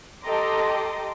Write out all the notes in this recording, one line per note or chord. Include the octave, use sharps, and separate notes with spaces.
G4 A4 D#5 A#5 C6 D6